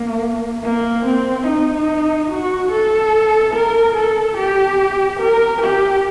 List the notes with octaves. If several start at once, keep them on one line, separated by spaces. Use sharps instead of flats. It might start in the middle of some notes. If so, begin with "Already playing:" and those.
Already playing: A#3
A#3
C4
D#4
F#4
A4
A#4
A4
G4
A#4
G4